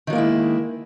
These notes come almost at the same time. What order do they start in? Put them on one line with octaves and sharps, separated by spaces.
D#3 F#3 A#3 G#3 E4